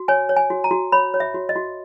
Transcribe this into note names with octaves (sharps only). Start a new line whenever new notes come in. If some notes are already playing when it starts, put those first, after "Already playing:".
Already playing: F#4
C#5 G#5
C#5
G#5
F#4
A#5
F#4
C#5 B5
C#5
E5
F#4
D#5
F#4